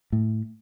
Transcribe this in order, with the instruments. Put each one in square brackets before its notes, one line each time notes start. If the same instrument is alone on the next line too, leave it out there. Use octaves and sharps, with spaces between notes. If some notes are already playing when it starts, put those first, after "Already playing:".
[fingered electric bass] A2